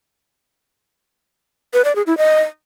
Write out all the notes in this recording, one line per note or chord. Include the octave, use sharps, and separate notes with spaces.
B4
D5
G#4
E4
D#5